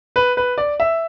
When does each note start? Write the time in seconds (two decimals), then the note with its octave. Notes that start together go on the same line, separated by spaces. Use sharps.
0.16 B4
0.37 B4
0.58 D5
0.80 E5